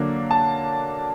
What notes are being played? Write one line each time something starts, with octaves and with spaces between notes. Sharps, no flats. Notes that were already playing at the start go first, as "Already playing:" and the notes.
Already playing: D3 F#3 A#3 D4
A5